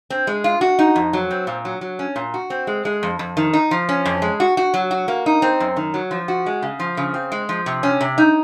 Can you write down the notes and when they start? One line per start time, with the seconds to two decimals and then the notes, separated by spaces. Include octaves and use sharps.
0.10 C4
0.27 G#3
0.44 F4
0.61 F#4
0.79 D#4
0.96 F2
1.13 F#3
1.31 C4
1.47 A#2
1.65 F#3
1.81 F#3
1.99 C#4
2.16 A#2
2.34 F#4
2.50 C4
2.67 G#3
2.85 G#3
3.03 F2
3.19 F2
3.37 D#3
3.53 D#4
3.71 F3
3.89 C#4
4.05 F2
4.22 G#3
4.40 F#4
4.57 F#4
4.74 F#3
4.91 F#4
5.08 A#3
5.26 D#4
5.42 C4
5.60 F#2
5.76 D#3
5.94 F#3
6.11 F3
6.28 F#4
6.46 G#3
6.62 C#3
6.80 F3
6.97 C#3
7.14 C4
7.32 G#3
7.49 F3
7.66 C3
7.83 C#4
8.01 C3
8.18 D#4